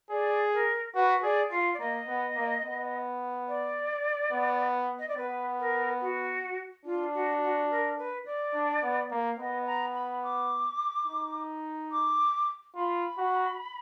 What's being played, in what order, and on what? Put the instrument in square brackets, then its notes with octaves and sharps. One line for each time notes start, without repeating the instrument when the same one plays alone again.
[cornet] G#4 [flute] D5
[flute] A#4
[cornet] F#4 [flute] B4
[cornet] G#4 [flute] D5
[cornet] F4 [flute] F5
[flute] D5
[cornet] A#3 [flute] D#5
[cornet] B3
A#3
B3
[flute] D5
[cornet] B3
[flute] D#5
D5
[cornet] B3 [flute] B4
[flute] A#4
F#4
[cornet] D4 [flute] F4
[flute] F#4
F#4
A#4
B4
D5
[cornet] D4
B3
A#3
[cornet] B3 [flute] D#5
[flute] A#5
B5
D6
[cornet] D#4
[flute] D6
[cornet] F4 [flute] B5
[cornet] F#4